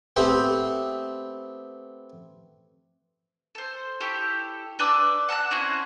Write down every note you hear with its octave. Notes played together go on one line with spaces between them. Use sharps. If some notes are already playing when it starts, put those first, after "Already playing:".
A3 B3 C4 G4 C5
A4 C5
E4 G4 A4 C#5
D4 B4 D6 E6
F#5 A5 E6 F#6
C4 C#4 E4 F#4